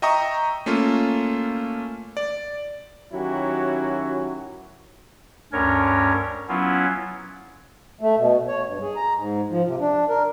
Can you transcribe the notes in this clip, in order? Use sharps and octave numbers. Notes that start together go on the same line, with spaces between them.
D#5 E5 G5 A#5 C#6 D#6
A3 A#3 C#4 F4
D5
D#3 F#3 C#4 E4 F#4 G4
D2 G2 C#4 A#4 C#5
F#3 B3 C#4 E4 F4
A3
B2
C#5
G2
G#4
A#5
G#2
F3
C3
D4
A#4